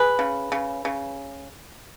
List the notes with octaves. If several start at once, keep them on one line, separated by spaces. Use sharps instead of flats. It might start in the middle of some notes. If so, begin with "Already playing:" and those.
Already playing: G#4 B4
C#3
C#3
C#3